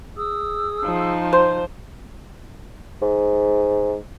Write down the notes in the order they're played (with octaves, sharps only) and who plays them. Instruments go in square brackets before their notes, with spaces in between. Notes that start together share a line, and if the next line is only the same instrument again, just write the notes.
[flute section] G#4 D#6 E6
[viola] F3 D#4
[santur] C5
[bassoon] G#2